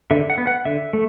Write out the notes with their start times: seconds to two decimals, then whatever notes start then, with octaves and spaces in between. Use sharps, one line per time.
0.11 D3 E5
0.30 F#5
0.38 B3
0.47 F#5
0.65 D3 E5
0.93 A3